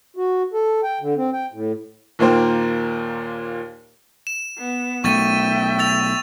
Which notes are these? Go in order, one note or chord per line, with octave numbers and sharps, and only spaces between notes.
F#4
A4
G5
D3
C4
G5
A2
D#2 A#2 A#3 C5 G5
E7
B3
B1 A3 E5 G5 C#6 A6 D#7
E6 A6 F7